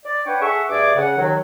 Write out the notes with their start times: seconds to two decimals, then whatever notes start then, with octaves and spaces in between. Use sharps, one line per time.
0.06 D5
0.26 D4 B4 C#5 F#5 G5 C#6
0.42 G#4 A4 E5 F#5 C#6
0.69 G2 A3 G#4 D5 D6
0.96 C#3 F#5
1.18 D#2 D#3 F#3